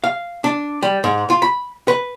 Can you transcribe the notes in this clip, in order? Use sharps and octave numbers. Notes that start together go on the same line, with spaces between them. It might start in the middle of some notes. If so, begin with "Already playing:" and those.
F5
D4
G3
G#2
F4
B5
B4